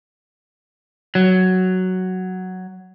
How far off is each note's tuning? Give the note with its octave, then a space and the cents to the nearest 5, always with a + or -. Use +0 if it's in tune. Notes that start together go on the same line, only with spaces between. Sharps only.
F#3 +5